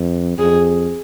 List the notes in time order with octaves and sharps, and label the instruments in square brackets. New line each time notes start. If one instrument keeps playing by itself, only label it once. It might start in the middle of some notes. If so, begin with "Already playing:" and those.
Already playing: [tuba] F2
[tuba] F2 [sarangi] G#4